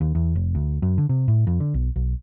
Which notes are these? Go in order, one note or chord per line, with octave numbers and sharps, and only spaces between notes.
D#2
E2
F1
D2
F#2
D3
C3
A2
F2
D3
B1
B1